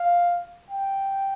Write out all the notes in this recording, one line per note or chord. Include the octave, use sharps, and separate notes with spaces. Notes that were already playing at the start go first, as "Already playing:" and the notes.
Already playing: F5
G5